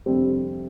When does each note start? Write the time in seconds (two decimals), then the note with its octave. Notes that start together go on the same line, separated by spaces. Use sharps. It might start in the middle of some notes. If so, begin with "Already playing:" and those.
0.06 G1 F2 C3 G3 C4